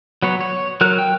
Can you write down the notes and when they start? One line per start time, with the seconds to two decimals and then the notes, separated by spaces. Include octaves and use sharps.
0.22 F#3 B3 C#5
0.41 C#5
0.81 F#3 A#4 F#6
0.99 G5